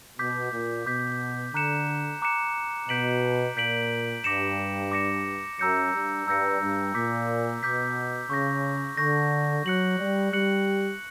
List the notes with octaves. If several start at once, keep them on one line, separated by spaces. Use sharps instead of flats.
B2 D6 G6 B6
A#2
B2 D6 G6 B6
D3 A#5 D6 F#6 C#7 E7
A#5 D6 F#6 C#7 E7
B2 G6 B6 D7 F#7
A#2 G6 B6 D7 F#7
G2 D6 A#6 C#7 E7
D6 A#6 C#7 E7
F#2 A#5 E6 G6 A#6 C#7
G2
G2 A#5 E6 G6 A#6 C#7
G2
A#2 D6 G6 B6
B2 D6 G6 B6
C#3 C#6 G6 A#6
D3 C#6 G6 A#6
F#3 F#6 C#7 F#7
G3
G3 F#6 C#7 F#7